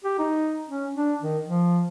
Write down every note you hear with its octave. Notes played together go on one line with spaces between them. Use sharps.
G4
D#4
C#4
D4
D#3
F3